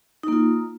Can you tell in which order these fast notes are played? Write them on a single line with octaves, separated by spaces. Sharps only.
D#4 A#3 F4